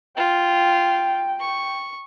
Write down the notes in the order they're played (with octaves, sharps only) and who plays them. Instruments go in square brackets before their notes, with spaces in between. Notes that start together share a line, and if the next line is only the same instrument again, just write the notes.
[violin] F4 [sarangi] G5
[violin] C#6